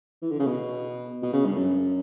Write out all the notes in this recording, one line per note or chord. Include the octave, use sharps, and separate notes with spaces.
E3
D3
C#3
B2
B2
C#3
G2
F#2